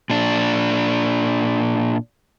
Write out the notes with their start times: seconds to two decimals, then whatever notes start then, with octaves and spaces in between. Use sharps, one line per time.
0.10 A#2 D4